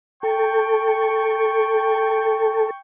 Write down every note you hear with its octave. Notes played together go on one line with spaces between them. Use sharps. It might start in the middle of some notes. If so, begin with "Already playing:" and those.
A4 G5 C#6